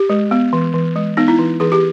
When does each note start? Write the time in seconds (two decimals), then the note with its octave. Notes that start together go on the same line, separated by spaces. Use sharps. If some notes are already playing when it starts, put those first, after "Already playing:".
Already playing: G4
0.10 G#3
0.31 B3
0.53 E3
0.74 E3
0.96 G#3
1.17 B3 D#4
1.28 E4
1.39 E3
1.60 E3 G#4
1.72 G4